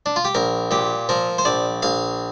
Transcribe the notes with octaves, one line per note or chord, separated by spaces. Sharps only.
D4
F4
G4
A#1 A#4
A#2 G4
F3 A#4
C5
A#1 D5
A#1 F5